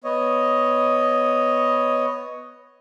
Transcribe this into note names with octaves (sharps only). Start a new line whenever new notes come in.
B3 C#5 D#5